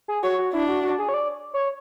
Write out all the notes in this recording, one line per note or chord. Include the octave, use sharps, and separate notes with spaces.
G#4
F#4 C#5
F#4
D4 E4
F#4
F#4
G#4
C#5
D5
C#5